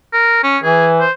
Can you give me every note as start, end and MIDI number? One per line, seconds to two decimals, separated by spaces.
0.13 0.41 70
0.43 0.58 61
0.63 1.04 52
0.63 0.89 68
1.00 1.11 72